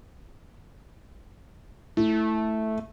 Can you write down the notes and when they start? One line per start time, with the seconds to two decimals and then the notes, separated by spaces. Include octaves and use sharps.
1.97 A3 E4